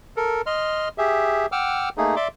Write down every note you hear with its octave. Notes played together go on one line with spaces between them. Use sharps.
A4 A#4
D#5 C6 F6
G4 G#4 E5
F#5 G5 D6 E6 F6
A3 A#3 D#4 G#4
D5 E5 C6 D6